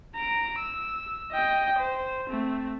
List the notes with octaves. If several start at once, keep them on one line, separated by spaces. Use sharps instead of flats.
A#5 D7
E6
D#5 G5
C5
A3 C4